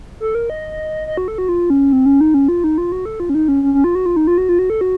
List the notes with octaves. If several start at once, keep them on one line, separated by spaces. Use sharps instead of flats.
A4
A#4
D#5
D#5
F#4
A4
F#4
F4
C#4
C4
C#4
D#4
C#4
F4
D#4
F4
F#4
A4
F4
C#4
D#4
C#4
C#4
C#4
F4
F#4
F4
D#4
F4
F#4
F4
F#4
A4
F#4